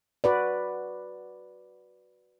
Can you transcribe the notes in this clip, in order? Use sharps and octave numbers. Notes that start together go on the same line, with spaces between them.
F#4 B4 D5